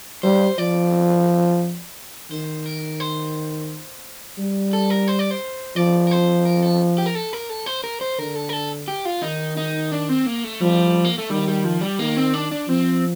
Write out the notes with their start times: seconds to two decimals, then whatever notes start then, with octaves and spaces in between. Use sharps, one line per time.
0.23 G3 C5
0.58 F3 D5
2.31 D#3 C5
2.66 A#4
3.00 C5
4.38 G3
4.73 A4
4.90 A#4
5.08 C5
5.19 D5
5.31 C5
5.76 F3 D5
6.07 A#4
6.11 C5
6.45 A#4
6.63 A4
6.98 G4
7.06 A#4
7.15 A4
7.33 A#4
7.50 A4
7.66 C5
7.84 A#4
8.01 C5
8.19 D3 A#4
8.35 A4
8.49 A#4
8.53 A4
8.88 G4
9.05 F4
9.22 D#3 D#4
9.57 D#4
9.92 D4
10.09 C4
10.26 A#3
10.44 A3
10.61 F3 G3
11.04 A#3
11.18 A3
11.30 D#3 G3
11.48 G3
11.64 F3
11.81 G3
11.99 D#3 A#3
12.17 C4
12.34 D4
12.51 D4
12.68 F3 C4